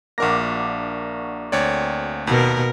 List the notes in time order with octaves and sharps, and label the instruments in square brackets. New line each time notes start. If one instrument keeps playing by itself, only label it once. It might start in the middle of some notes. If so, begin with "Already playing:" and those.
[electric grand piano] A#1 A#4 A#6 [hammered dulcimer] A#3 D4 F#4
[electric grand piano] D2 C#5 D5 [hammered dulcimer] C4
[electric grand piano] D#2 [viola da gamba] B2 A#4